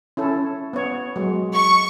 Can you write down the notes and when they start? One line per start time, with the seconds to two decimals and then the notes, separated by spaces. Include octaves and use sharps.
0.17 C#4 E4 A4
0.73 B3 C#5
1.16 F#3 G#3
1.55 C#6